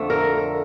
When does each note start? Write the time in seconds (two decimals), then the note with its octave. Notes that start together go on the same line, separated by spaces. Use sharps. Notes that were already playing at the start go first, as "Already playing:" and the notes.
Already playing: F2 D3 F3 A3
0.10 A#4